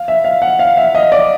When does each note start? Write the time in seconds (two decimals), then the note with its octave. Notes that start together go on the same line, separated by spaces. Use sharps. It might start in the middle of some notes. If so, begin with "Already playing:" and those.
Already playing: F5
0.08 E5
0.24 F5
0.42 F#5
0.59 F5
0.77 E5
0.95 D#5
1.12 D5